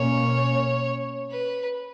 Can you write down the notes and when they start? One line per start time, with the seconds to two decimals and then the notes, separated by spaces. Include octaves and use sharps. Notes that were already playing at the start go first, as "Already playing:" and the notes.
Already playing: B2 A#3 C#4 C#5
1.31 B4